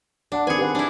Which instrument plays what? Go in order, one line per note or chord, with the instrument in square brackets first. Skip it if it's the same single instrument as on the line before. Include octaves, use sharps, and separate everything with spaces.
[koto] D4 [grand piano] D5 F#5 A5
[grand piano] D#3 C4 C#7 [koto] G#4 G#5 [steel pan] B4
[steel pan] G4 B4 F#5
[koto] D4 E4